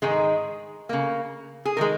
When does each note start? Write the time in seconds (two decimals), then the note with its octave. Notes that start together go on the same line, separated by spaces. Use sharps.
0.02 G#2 D#3 G#3 G#4
0.89 C#3 A#3
1.65 G#4
1.77 D#3 G#3 A#4